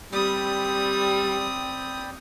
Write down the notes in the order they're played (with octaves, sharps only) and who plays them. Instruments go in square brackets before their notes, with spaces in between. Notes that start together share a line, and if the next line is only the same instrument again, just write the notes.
[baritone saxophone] G3 [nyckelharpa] C4 D#6 [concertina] D5 G5 B5